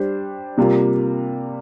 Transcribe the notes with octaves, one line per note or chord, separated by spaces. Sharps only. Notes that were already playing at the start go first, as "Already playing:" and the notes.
Already playing: G3 D4 G4 C5
C3 G3 A#3 F4